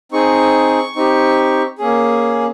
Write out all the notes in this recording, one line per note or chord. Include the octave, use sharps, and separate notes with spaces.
C4 D#4 G#4 C#6
C4 D#4 G4
A#3 C#4 G#4